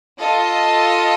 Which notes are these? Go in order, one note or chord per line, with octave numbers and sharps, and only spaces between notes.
F4 A4 D#5